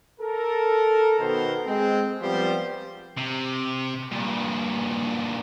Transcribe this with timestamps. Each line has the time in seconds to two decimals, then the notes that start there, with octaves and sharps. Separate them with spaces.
0.20 A4 A#4
1.18 B2 D#3 B3 A4 A#4 C5
1.66 G#3 C4
2.20 F3 G3 B3 C4 G4 C5
3.18 C3
4.12 G2 A#2